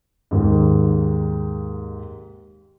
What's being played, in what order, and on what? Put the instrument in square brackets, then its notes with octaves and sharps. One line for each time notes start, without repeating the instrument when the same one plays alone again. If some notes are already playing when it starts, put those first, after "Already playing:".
[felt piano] D#2 G#2